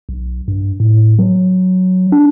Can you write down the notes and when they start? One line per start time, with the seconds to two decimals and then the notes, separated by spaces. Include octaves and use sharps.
0.09 B1
0.48 G2
0.80 A2
1.19 F#3
2.12 D4